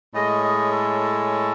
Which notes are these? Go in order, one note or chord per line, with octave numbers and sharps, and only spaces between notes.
A2 G#3 C#4 D#5
D#5
A4